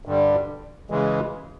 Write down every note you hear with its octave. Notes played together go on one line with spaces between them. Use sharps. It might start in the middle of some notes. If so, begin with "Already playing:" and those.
G2 D3 G3
C#3 E3 G#3